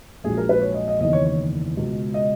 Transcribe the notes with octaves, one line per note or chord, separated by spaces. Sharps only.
A#1 G#2 F#3 G#4
A#4
B4
C#5
D#5
D#5
F#1 E2 D#3 D#5
C#5
C#5
C#2 B2 G#3
D#5